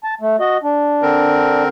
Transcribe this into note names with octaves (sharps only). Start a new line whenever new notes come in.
A5
A3
F#4 D#5
D4
D3 C4 A#4